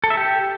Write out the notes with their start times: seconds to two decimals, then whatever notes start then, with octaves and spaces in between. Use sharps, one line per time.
0.04 A4
0.10 E5
0.17 G4